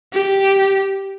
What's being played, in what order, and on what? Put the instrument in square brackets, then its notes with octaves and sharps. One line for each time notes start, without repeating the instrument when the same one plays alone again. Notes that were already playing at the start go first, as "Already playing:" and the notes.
[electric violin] G4